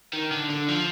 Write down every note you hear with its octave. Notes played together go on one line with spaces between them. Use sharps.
D#3
D3
D3
F3